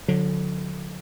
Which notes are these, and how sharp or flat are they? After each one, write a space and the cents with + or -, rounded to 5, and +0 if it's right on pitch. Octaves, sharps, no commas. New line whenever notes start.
D3 +0 F#3 -40